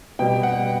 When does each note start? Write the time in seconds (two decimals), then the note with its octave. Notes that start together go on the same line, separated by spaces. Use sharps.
0.19 B2 G3 G5
0.43 F#5